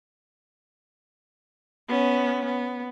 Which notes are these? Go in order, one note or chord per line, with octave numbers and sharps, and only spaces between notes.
B3 C#4
B3